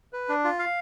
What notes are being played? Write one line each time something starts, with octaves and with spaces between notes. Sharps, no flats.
B4
D4
F4
F5